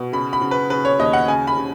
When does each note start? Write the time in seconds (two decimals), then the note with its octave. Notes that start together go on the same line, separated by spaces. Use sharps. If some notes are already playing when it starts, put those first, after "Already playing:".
Already playing: B2
0.13 C#3 B5
0.33 B5
0.41 C#3
0.51 B4
0.70 C#3 B4
0.85 C#5
0.99 D#2 D#5
1.13 F#5
1.28 C#3 G#5
1.47 B5
1.58 C#3